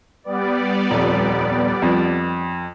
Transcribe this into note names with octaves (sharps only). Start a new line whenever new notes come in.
G3 B3 D5
D#1 F2
F2